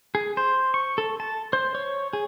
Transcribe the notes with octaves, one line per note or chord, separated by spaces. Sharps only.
G#4
C5
C#6
A4
A5
C5
C#5
G#4